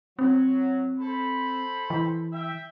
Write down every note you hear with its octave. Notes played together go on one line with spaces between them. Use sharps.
F#3 C4
A4 C5 B5
E3
E5 G5